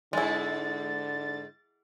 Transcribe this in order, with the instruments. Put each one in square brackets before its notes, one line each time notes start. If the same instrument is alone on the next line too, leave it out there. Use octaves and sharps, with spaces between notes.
[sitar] E2 G#2 [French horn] D3 [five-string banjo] G#3 E4 [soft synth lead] A6